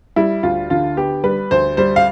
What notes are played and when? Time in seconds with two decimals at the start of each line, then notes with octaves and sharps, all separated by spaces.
0.16 G3 E4
0.43 D2 F4
0.70 D3 F4
0.97 B3 G4
1.24 G3 B4
1.51 D2 C5
1.77 G3 C5
1.96 F5